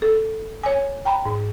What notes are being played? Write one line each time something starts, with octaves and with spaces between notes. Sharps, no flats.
A4
C#5 G#5
G5 A#5 B5
G#2